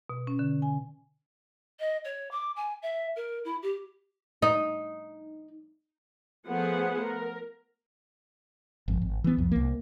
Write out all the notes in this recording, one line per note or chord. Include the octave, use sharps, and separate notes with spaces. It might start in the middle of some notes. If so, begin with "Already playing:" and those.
B2
C#4
D3
G#5
D#5
C#5
D6
G#5
E5
A#4
E4
G4
D#4
F3 A3 B3 G#4 C5 F#5
A#4
G#1 F2
G#1
E3 B3
C2 F2
C2 A#3